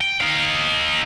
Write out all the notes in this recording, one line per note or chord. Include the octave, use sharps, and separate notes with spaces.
G5
D#4 F5